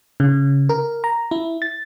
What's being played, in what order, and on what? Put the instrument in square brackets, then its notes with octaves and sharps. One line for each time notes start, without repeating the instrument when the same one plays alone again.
[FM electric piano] C#3
A#4
A#5
E4
A6